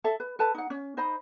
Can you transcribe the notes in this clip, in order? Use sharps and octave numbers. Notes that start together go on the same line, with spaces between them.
A4 E5
B4
A4 B4 A5
D#4 F#5
C#4
D#4 C5 D#5 B5